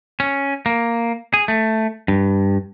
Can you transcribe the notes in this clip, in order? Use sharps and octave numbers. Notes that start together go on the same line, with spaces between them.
C#4
A#3
G#4
A3
G2